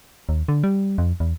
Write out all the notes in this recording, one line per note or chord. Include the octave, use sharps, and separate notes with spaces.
D#2
D3
G3
F2
E2